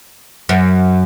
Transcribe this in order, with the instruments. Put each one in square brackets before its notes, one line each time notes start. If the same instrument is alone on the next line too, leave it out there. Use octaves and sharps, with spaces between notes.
[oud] F#2